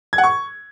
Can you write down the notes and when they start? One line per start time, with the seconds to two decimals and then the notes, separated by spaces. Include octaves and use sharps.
0.13 G#6
0.18 F#5
0.24 C#6